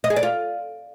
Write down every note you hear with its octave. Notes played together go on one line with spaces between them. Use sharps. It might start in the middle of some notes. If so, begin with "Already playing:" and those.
D#5
G#4
D5
F4